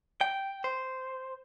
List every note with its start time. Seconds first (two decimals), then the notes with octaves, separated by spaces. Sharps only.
0.21 G5
0.64 C5